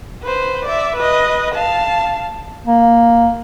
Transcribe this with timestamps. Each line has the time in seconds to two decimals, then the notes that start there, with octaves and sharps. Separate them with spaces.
0.23 B4 C5
0.65 D5 E5
0.97 B4 D#5
1.55 F5 A5
2.67 A#3